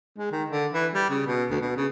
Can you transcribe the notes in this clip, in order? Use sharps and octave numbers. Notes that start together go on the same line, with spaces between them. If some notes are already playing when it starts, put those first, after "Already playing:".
G#3
D#3
D3
E3
G3
C#3
B2
D2
B2
C#3